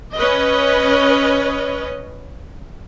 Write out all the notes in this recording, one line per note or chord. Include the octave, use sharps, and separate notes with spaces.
C#4 B4 C#5 D#5